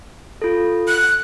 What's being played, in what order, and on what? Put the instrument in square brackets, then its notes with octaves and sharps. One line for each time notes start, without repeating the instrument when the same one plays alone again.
[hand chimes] F4 A4
[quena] F#6